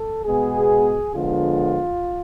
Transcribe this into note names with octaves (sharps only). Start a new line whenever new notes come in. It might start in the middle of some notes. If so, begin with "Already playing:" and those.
Already playing: A4
B2 G#3 B3 G#4
D3 F3 G#3 B3 F4